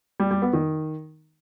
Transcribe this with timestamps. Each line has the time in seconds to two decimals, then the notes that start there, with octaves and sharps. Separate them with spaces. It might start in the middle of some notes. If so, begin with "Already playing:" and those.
0.20 G3
0.31 G3
0.42 B3
0.53 D#3